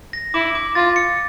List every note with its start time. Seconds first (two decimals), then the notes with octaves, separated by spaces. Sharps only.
0.13 A#6
0.34 E4 D6
0.55 D6
0.75 F4 A6
0.96 C#7